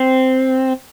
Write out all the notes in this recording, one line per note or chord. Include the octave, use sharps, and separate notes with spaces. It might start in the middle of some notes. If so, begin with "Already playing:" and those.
Already playing: C4